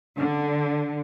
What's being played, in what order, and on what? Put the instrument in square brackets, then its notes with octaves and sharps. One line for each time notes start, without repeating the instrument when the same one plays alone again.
[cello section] D3